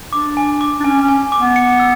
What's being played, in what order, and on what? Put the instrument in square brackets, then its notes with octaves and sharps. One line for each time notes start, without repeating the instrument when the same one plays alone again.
[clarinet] D4 [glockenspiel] D6
[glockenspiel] G#5
D6
[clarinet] D4
[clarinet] C#4 [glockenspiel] G#5
[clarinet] C#4
[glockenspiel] G#5
D6
[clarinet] B3
[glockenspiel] C#7
E6